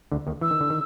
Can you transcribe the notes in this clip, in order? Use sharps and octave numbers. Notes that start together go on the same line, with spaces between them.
D2 D3
D#2 D#3
E3 E6
D#3
D3
D#3